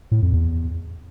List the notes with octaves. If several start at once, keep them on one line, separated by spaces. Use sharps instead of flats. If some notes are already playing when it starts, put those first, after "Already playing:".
A2
F2
E2